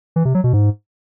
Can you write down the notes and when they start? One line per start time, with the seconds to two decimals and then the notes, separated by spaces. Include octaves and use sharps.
0.16 E3
0.25 C3
0.35 F#3
0.44 B2
0.53 G#2